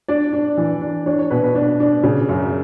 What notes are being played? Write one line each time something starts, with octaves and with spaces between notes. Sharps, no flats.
D4 D5
D4
E3
D4
D4 C#5
C#5
B2 B4
B4
D4
D4
C#3
F#2